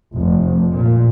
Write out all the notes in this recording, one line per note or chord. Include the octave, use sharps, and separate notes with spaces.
F1
A#2